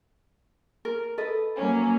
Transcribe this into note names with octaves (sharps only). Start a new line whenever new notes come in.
A#4
A4 B4 D#5
F#3 A#3 C#4